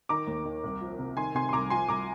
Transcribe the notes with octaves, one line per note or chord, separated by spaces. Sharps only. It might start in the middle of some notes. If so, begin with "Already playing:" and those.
D#3 A#5 D6
D#2
D#3
C2
F3
C3
D#3 G#5 C6
C3 G#5 C6
C6
C2 A#5 D6
F3 G#5 C6
C2 A#5 D6